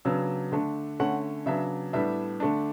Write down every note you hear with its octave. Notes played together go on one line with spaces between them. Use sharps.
C#3 F#3 B3 D4 E6
D3 A3 D4
D3 A3 C#4 F#5
C#3 F#3 B3 D4 E5
A2 G3 B3 D4 E5
D3 A3 D4